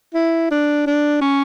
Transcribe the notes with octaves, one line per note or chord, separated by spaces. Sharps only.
E4
D4
D4
C#4